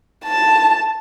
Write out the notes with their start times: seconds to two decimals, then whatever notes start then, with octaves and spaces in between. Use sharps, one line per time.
0.25 A5